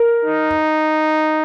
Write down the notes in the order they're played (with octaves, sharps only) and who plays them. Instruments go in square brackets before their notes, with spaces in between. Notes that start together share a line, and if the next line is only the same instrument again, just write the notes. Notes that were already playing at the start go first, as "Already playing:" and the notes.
Already playing: [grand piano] A#4
[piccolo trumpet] D#4